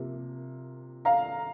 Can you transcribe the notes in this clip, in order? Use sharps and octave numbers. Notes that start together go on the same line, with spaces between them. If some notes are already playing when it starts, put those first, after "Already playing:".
Already playing: C3 F3 A#3
F5 A#5